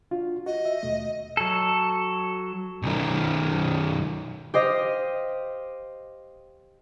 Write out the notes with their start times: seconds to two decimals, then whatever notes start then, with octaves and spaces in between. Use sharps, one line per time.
0.11 D4 F4 F#4
0.47 F#4 D#5
0.65 E5
0.83 D#2 B2 A3
1.37 F#3 A4
2.83 B1 D#3
4.54 G4 C5 D#5 F5